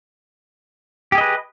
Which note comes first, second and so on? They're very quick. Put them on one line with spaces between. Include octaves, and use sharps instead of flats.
G4 G#4 D#5 B4